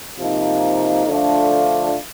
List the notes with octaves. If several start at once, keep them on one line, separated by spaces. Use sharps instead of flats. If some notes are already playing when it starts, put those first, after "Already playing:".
C3 F3 A#3 D#4
D3 F3 A3 D4 F4